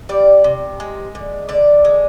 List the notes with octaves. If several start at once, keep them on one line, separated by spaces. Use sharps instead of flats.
G3 D5
C3
G#3
D3
D3 D5
G#3